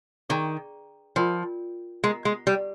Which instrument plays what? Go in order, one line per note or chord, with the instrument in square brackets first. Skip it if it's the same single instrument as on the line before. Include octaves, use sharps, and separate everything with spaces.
[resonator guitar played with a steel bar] D#3 [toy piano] G#4 D5 G5 A#5
[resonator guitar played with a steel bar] F3 [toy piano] F4 A#4 D5 G5
[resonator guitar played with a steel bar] G#3 [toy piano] A#4 D#5 A#5
[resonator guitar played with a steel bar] G#3
G3